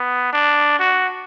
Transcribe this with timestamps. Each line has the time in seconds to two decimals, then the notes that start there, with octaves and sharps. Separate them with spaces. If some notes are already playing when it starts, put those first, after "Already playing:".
Already playing: B3
0.33 D4
0.79 F#4